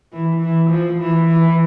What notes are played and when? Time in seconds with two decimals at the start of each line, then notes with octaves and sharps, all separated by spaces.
0.13 E3
0.41 E3
0.70 F3
0.99 E3
1.27 E3